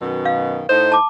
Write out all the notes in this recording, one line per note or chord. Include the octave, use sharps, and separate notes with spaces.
F#2 B2 D#3
F5
A2 D#4 C5
A5 D6